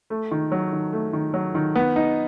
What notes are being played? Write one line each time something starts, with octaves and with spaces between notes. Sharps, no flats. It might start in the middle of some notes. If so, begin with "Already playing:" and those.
A3
D#3
F#3
D#3
A3
D#3
F#3
D#3
B3
D#4